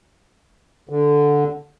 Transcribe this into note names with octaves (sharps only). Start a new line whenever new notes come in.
D3